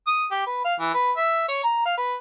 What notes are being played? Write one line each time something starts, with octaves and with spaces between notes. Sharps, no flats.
D#6
G4
B4
F5
E3
B4
E5
C#5
A#5
F5
B4